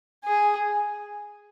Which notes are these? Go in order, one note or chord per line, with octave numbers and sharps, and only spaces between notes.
G#4